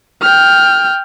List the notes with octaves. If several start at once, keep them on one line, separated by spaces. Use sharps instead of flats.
G5 F6